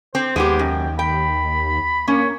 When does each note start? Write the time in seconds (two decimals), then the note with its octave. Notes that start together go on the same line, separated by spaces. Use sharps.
0.15 C4 C5
0.36 D#2 G#3 B3 G4
0.59 F#2 G5
0.99 G5 B5
2.08 A#3 C#4 C#5